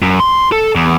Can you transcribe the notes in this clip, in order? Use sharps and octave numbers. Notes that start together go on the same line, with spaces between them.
F#2
C6
A4
E2